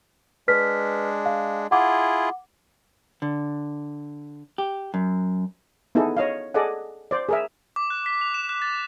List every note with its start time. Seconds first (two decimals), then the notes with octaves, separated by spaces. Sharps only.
0.48 G#3 D4 B4 F6 B6
1.26 F5
1.71 E4 F4 G#4 F#5 D6
3.22 D3
4.58 G4
4.94 F#2
5.95 B3 D#4 E4 G#4 A4
6.17 C#5 D#5 F5
6.54 G#4 A4 D5 D#5 F#5
7.11 C5 D5
7.29 G#4 A#4 E5
7.76 D6
7.90 F#6
8.06 B6
8.21 F7
8.34 E7
8.49 F#6
8.62 A6